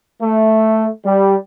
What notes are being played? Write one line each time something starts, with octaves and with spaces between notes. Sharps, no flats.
A3
G3